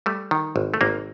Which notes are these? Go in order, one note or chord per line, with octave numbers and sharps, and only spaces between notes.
G3 A3
D#3
G#1
A3
G#1 A#3